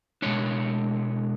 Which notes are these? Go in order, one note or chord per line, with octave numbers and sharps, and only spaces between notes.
B2 G#3 D4 C#5